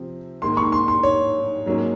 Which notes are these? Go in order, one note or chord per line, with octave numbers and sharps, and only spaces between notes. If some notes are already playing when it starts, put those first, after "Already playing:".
Already playing: C3 F3 C4
G#2 D#3 A#3 C6
C#6
C6
C6
C#5
G#2 F#3 A#3 C#4